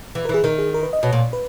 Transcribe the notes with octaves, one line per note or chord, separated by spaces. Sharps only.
E3
A#4
E3
G#4
D#3 A#4
G#4
A#4
B4
D#5
B2 C#5
A#2
B4